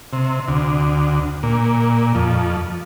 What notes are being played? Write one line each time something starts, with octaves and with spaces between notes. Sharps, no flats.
C3
D2
A#2
F2